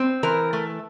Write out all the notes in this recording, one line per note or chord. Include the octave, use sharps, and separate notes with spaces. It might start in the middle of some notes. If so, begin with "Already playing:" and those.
Already playing: C4
E3 A#4
A3